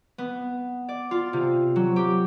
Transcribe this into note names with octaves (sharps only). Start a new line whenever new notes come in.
B3
D5
F4
C3
F#3
G4